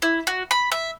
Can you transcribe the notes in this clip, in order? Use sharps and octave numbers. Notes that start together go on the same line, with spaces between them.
E4
F#4
B5
E5